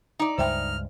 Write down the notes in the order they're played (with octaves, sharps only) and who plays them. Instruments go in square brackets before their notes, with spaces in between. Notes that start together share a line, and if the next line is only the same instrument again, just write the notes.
[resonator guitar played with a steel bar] D#4 D5
[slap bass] C#2 G2 G#3 [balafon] C5 E5 G5 [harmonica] F6